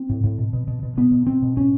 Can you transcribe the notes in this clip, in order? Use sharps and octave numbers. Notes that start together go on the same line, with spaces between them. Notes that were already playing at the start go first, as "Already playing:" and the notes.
Already playing: C4
A2
A2
B2
B2
B2
B2
B2 B3
B2
B2 C4
B2
A2 C#4